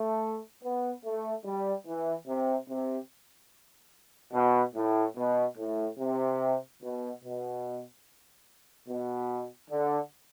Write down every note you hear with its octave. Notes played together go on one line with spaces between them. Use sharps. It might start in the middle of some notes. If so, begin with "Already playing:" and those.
Already playing: A3
B3
A3
G3
E3
C3
C3
B2
A2
B2
A2
C3
B2
B2
B2
D3